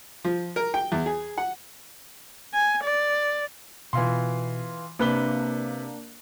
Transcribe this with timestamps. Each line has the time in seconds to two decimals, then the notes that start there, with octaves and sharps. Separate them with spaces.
0.24 F3
0.56 A#4
0.74 G5
0.92 E2
1.06 G#4
1.38 F#5
2.54 G#5
2.84 D5
3.93 B2 E3 F4 C6
4.99 C3 A#3 D4 B4 G7